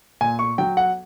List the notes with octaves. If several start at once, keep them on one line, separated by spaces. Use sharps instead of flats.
A#2 G#5
C#6
F#3 G5
F#5